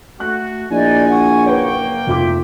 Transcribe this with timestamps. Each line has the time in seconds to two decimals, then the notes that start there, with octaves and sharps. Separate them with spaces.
0.20 A3 F#4 F#6
0.71 A#1 D#4 E4 D5 D#5 G#5
1.09 F#5 C#6
1.46 F#1 A#3 B4 C#5 G5
2.07 F1 F4 E5 D6